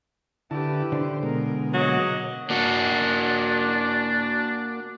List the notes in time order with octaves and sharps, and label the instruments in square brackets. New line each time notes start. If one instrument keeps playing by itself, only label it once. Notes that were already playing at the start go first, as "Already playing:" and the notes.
[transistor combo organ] D3 E4 A5 [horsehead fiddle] G4 B4
[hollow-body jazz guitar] D3 [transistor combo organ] C5
[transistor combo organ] B2 G#3 [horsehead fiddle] A#4
[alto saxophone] F#3 [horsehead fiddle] A#3 D#5
[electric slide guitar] A#3 F#4 [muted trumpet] D4